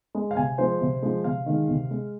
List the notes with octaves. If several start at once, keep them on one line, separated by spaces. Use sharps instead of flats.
G#3
F5
C3 G#5
F3 G#3 C5
C3
F3 G#3
C3 F5
D#3 G#3
C3
G#3